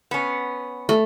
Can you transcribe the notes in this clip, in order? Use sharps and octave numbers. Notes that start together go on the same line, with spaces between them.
B3 C#4
A3